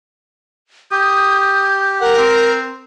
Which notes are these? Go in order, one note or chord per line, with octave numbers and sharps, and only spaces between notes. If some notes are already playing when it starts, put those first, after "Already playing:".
G4 D#6 G6
A#4 F#5
C4